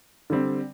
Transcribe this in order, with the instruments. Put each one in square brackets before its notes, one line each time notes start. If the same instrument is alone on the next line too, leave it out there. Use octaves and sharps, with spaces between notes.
[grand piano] D3 G3 C4